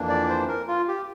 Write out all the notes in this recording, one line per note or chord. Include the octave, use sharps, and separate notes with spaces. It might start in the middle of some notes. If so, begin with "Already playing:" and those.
Already playing: F2 E3 A#3 D4
D5
C5
A#4
F4
G4